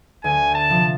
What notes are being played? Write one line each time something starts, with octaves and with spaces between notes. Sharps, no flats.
D2 G#5
A5
C3 F3